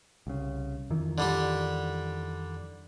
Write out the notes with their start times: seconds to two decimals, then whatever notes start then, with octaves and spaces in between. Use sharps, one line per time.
0.27 C2 C#3
0.90 F2 D#3 E3
1.18 D3 G3 G4